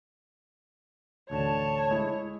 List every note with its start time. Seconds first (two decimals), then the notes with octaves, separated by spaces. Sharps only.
1.30 A1 D2 D3 C#5 A5
1.91 G#3 E4